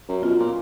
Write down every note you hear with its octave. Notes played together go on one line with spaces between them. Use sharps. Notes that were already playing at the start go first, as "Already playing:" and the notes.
F#2
B2 F4
A#2